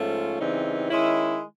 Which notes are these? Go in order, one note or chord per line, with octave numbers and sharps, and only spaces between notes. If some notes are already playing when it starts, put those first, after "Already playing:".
Already playing: G#2 F3 A3 C#4 F4
C#3 E3 G3 C4 D#4
D#3 G#3 C#4 E4